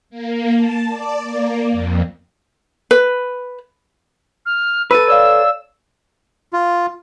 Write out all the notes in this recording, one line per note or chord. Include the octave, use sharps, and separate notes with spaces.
A#3
A5
D5
A#3
F2
B4
F6
A4 B4 E6 D#7
C#5 D5 F5 E6
F4